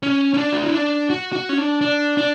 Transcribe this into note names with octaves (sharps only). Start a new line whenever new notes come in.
C#4
C#4
D4
F#4
E4
D4
F#4
F#4
C#4
D4
D4
D4